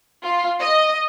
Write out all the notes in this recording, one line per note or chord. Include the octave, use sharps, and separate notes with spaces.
F4
D#5